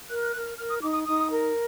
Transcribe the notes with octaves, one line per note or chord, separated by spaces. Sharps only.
A#4 F#6
F#6
A#4 F#6
F6
A#4 F6
D#6
D#4 D6
D#6
D#4 D#6
A#4